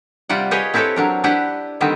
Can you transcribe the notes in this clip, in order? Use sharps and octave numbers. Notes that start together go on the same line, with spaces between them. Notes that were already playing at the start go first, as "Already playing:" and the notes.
C3 G3 F4 D5 F#5
G4 G#4 B4 C#5 D#5
C4 E4 G4 A4 B4 C#5
F#3 D4 A#4
D4 E4 G4 B4 D5 F#5
D3 D#3 G3 B3 C4